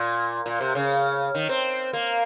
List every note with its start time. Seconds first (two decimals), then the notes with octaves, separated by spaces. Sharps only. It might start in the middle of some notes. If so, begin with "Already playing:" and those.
Already playing: A#2
0.46 A#2
0.61 C3
0.75 C#3
1.35 D#3
1.49 C4
1.93 A#3